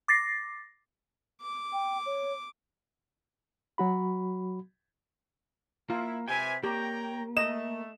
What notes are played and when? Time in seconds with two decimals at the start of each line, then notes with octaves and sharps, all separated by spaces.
0.08 D6 A6 A#6 C7
1.41 D6
1.73 G5
2.06 C#5
3.78 F#3 F#4 B5
5.90 A#3 E4 F4
6.28 C3 B4 G5 G#5
6.64 A#3 G4 C#5 G5 A#5
7.37 A3 D#5 E7